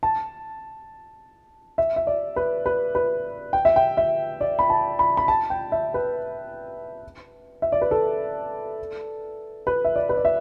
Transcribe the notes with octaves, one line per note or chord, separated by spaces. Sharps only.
A5
E5
E5
D5
B4
B4
B4
G5
E5
G5
E5
D5
B5
A5
B5
B5
A5
G5
E5
B4
E5
D5
B4
A4
B4
E5
D5
B4
D5
E5